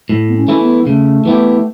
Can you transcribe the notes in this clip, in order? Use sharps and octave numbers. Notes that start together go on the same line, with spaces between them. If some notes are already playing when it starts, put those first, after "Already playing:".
A2
B3
C#4
E3 A3 E4
B3
C#3 A3
E3 B3 E4 G4